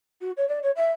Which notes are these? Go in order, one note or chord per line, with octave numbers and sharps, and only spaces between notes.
F#4
C#5
D5
C#5
E5